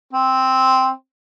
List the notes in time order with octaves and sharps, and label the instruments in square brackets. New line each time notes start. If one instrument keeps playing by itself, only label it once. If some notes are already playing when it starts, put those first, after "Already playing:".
[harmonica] C4